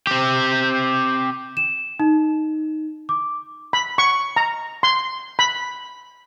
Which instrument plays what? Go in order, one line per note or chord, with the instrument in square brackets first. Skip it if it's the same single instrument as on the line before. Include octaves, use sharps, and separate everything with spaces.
[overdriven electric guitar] C4 G4
[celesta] E7
D#4
D6
[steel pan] B5
C#6
A#5
C6
B5